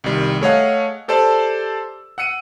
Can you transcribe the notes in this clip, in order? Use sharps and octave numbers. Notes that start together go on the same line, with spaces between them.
C2 D#3 G3
A3 G#4 C#5 D#5 F5 F#5
G4 A4 C5 D5 A5 E6
F#5 E6 C#7 D#7